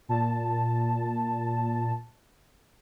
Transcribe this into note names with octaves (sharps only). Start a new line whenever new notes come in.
A#2 A5